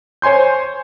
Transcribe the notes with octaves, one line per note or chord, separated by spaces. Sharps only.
C5 C#5 G#5 C6 G6